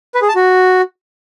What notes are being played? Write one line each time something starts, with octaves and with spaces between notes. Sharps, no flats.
B4
G#4
A5
F#4